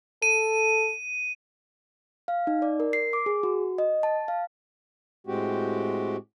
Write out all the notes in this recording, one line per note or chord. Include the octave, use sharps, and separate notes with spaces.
A4 D#7
F5
D#4
D5
A#4
C7
D6
G#4
F#4
D#5
A5
F5
A2 G#3 C4 F#4 G4